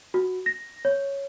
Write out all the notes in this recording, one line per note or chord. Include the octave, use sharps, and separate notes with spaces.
F#4
A#6
C#5